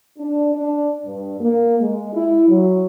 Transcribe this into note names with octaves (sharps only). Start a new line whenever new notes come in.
D4
D4
G2
A#3
G#3
E4
F#3